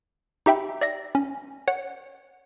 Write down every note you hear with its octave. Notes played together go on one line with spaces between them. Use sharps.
D#4 G4 E5 G5 B5
D5 E5 A#6
C#4
C#5 F#5